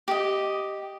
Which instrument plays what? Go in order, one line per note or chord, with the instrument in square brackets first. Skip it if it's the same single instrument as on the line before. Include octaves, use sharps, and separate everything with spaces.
[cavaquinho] G4 D#5